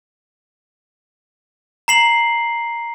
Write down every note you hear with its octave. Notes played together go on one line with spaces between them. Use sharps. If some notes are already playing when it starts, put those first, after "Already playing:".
A#5 C7 F#7